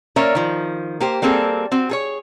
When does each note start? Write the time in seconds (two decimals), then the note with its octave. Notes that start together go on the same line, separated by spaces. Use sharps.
0.16 A#3 C#4 A#4 C#5 D5 E5
0.35 D#3 F3
1.00 A#3 G4 C5
1.22 G3 A#3 C4 G#4 A4
1.72 C4 F#4
1.89 G#4 A4 C#5